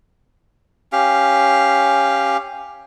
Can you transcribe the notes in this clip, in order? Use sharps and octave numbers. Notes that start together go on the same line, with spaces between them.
C#4 G4 F5